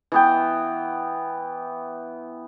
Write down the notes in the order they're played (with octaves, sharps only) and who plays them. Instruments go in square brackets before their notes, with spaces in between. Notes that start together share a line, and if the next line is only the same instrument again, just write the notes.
[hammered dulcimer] E3 B3 G5